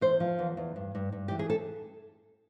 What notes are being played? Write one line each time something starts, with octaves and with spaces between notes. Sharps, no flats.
E2 C5
F3
E2
E2
G2
G2
G2
E3 G4
G#4
A4